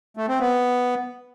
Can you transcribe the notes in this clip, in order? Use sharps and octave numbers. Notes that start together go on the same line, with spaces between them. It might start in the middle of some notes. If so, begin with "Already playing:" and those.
A3
C4
B3